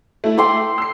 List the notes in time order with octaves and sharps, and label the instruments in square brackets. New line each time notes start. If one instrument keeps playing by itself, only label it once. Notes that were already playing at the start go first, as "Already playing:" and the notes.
[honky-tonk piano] A3 E4
[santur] G5 C6 D6
[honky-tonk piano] E6 C7